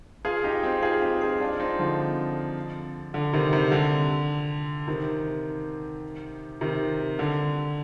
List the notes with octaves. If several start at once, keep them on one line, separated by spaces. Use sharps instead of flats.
F4 G#4
D#4 G4
C4 D#4
F4 G#4
D#4 G4
F4 G#4
D4 F4
C4 D#4
D3 F3
D3
C3 D#3
C3
D3
C3 D#3
C3 D#3
D3